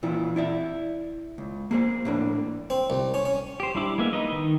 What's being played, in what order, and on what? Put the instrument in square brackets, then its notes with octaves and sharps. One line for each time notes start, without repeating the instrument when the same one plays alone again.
[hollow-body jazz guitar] A#2 E3 E4 F4
E4 D5 E5
C#2
A#3 G#4 C5
A2 A#3 D4
[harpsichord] C4
C2
C#4
C#4
[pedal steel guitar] G4 C5
G3 D4 E4 D6
G#3 A#3 B3 E5
D#4 B4 D#5
D#3